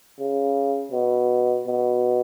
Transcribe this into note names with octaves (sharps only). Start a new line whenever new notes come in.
C#3
B2
B2